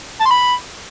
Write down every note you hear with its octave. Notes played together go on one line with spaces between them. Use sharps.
A5
C6
B5